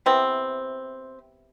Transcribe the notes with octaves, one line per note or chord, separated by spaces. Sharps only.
C3 E3 B3 C4